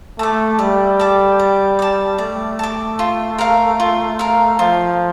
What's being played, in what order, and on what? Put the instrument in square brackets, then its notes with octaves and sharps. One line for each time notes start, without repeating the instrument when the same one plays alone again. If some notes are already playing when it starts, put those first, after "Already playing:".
[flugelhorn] A3 [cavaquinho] A5 D6
[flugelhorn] G3 [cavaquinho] D5
[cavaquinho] A5 D6
D5
A5 D6
[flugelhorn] A3 [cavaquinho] D5
[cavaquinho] A5 D6
F4
A#4 F5
F4
A#4 F5
[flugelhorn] F3 [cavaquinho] F4